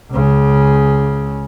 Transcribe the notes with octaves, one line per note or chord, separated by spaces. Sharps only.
C#2 C#3